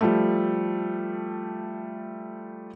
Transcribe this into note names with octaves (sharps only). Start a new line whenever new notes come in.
F3 G3 A3